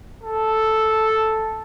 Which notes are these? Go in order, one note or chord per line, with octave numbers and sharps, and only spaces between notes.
A4